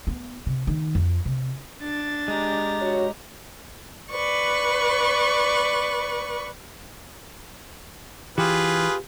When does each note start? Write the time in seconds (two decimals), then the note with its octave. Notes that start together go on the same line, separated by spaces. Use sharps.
0.07 B3
0.46 C3
0.67 D#3
0.95 F2
1.25 C3
1.81 D4 A6
2.28 G#3 G4 A#5
2.81 F#4 C#5
4.11 B4 D5 C#6
8.38 E3 F4 G4 G#4 B4